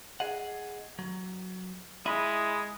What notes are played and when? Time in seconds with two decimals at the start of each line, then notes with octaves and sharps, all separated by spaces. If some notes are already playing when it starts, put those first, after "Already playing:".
0.20 G#4 D#5 F#5
0.99 F#3
2.06 G#3 E4 D#5 B5